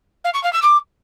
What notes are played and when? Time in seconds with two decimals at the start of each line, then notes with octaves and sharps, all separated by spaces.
0.24 F5
0.33 C#6
0.43 F5
0.52 E6
0.62 D6